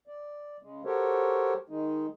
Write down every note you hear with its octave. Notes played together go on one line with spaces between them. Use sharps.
D5
C#3 G#3
F#4 G4 A4 A#4 C5 C#5
D#3 G#3 D#4